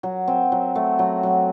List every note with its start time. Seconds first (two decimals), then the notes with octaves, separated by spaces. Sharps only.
0.03 F#3
0.28 C4
0.52 F#3
0.75 A3
0.99 F#3
1.23 F#3